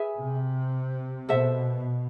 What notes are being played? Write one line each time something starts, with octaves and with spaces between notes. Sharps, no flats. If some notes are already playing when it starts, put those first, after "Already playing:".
Already playing: G#4 B4 E5 G#5
C3
B2 A4 C5 E5